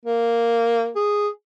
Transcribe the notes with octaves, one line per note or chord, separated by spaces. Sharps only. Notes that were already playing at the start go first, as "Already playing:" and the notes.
A#3
G#4